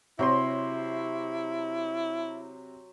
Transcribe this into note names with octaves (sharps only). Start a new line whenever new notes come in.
C3 F#3 E4 C5 C6